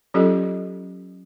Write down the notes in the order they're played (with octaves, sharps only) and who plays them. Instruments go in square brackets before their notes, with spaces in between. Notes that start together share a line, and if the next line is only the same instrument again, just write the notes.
[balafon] F#3 C#4 F4 G4 A4 D#5